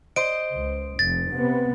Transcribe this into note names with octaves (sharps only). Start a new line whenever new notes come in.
C5 D#5 D7
C#2
F1 A6
C3 B3